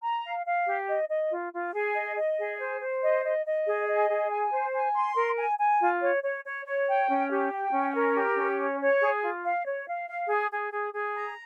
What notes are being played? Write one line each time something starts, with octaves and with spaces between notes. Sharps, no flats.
A#5
F5
F5
G4
D#5
D#5
F4
F4
G#4
D#5
D#5
G#4
C5
C5
D#5
D#5
D#5
G#4
D#5
G#4
G#5
C5
G#5
C6
A#4
G#5
G#5
F4
C#5
C#5
C#5
C#5
G5
C#4
G4
G5
C#4
A#4
G4
C#4
C#5
C#5
G#4
F4
F5
C#5
F5
F5
G#4
G#4
G#4
G#4
A#5